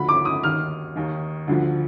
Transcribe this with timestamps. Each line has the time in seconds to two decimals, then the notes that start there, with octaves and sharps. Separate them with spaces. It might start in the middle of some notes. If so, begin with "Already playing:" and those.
Already playing: D2 D3 F3 B5
0.09 D6
0.25 D#6
0.43 D#2 D#3 F6
0.96 D#2 D#3
1.48 D2 D3 F3